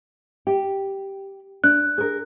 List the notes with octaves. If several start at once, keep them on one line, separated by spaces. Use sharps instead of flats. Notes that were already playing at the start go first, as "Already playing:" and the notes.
G4
D4 F#6
G#4 A#4